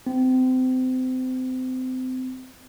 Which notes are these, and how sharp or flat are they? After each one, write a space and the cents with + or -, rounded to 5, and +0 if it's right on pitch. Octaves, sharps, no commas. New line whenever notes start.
C4 -30